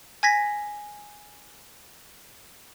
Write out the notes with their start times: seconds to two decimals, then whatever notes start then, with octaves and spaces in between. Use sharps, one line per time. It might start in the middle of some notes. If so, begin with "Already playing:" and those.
0.23 G#5 G#6 A#6 B6